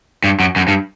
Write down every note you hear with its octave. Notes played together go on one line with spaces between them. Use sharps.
G2
F#2
F#2
G2